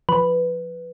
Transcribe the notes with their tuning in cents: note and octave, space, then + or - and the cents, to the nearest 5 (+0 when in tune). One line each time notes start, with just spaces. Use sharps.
F3 +0 B4 +5